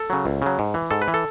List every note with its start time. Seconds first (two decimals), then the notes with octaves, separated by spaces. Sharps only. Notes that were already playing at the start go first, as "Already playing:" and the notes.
Already playing: A4
0.10 C#3 F#3
0.25 C#2
0.42 C#3 F#3
0.59 G#2
0.74 E3
0.91 G#2 A4
1.02 B4
1.08 E3
1.14 A4